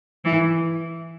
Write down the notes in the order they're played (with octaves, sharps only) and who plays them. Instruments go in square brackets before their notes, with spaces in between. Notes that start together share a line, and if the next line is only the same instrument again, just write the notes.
[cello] E3